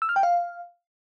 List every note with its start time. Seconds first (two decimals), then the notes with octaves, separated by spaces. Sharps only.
0.02 E6
0.09 F6
0.16 G5
0.23 F5